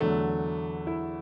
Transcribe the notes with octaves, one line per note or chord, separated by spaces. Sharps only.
E2 D3 F#3 A3
E4